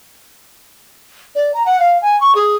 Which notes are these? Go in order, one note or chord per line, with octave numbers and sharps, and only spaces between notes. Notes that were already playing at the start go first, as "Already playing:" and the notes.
D5
A#5
F#5
F5
G#5
C#6
G#4